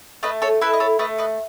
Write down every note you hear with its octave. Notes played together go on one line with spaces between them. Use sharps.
A3 B4 D#5
A4 C#5
E4 A4 B4
D#5
A4 C#5
A3 B4 D#5
B4 D#5